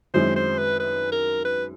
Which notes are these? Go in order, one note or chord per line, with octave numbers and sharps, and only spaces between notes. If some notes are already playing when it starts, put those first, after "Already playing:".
F#2 D#3 G#3 C4 E4 C5
C5
B4
B4
A#4
B4